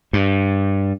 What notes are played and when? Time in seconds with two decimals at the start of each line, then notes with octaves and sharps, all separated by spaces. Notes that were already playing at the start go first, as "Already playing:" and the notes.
0.13 G2